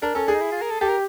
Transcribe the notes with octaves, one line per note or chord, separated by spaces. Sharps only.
D4 A#4
C#4 A4
D4 G#4
D#4
E4
F4
A#4
A4
G4 A4
A#4